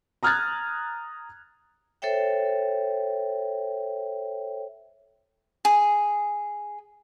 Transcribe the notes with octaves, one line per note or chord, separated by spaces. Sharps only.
A#5 D#6 F6 F#6 G#6 A6
A4 C5 C#5 E5 G5
G#4